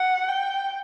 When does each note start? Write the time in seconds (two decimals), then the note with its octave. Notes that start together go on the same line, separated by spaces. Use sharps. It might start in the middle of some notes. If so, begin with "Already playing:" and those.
Already playing: F#5
0.29 G5